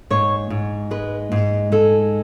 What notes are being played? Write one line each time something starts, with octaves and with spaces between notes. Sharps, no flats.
G#2 C#5
G#2
G#3 B4
G#2
G#3 A4